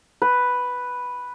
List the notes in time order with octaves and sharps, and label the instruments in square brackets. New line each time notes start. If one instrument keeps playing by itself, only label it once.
[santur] B4